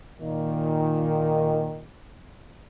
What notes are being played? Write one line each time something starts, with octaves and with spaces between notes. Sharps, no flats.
A#2 D#3